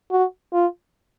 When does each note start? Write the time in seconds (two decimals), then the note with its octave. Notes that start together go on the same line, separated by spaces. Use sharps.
0.11 F#4
0.53 F4